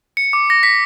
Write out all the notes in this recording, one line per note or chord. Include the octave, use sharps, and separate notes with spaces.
C#7
D6
A#6
B6